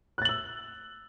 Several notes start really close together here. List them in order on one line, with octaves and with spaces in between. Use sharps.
F#6 A6 F#7 E6